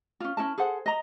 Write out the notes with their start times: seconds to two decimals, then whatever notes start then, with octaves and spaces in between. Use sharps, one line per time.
0.20 C#4 F4
0.37 C#4 E4 A#4 A5
0.58 G#4 A4 C5 F#5
0.86 D#5 A#5